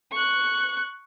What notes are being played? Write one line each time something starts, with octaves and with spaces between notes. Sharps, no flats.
C#6 F#6